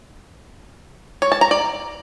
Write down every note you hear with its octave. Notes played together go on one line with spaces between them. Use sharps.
C#5
A5
A#5
D5